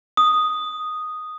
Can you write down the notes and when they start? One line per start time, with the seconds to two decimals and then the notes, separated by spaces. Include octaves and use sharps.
0.17 D#6